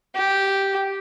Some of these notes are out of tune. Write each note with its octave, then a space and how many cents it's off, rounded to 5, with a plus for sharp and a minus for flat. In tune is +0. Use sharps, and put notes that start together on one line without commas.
G4 -5